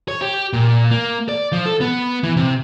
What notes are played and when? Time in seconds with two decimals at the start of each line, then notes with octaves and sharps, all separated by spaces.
0.08 C#5
0.22 G4
0.53 A#2
0.91 A#3
1.29 D5
1.53 F3
1.66 A4
1.81 B3
2.23 E3
2.36 C3